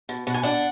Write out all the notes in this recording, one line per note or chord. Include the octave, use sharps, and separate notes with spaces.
B2
B2 F#5
G#5
D4 F#5